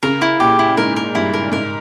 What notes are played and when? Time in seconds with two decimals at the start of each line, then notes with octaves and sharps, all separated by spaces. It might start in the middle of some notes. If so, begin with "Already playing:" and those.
0.03 C#3 A#4
0.22 E4
0.40 A#2 G4
0.59 E4
0.77 G#2 A#4
0.96 A#4
1.15 G2 E4
1.34 A#4
1.52 G#2 A#4